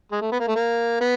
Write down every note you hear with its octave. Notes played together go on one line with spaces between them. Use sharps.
G#3
A3
B3
A#3
A3
A#3
B3